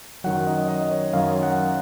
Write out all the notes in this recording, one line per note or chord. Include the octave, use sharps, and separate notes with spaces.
F#2 D#3 F#3 F#5
D#5
D#5
C#5
F#2 D#3 F#3 F5
F#5